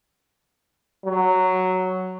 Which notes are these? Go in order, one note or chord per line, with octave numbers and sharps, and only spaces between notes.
F#3